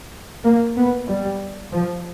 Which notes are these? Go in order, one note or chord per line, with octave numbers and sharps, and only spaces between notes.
A#3
B3
G3
F3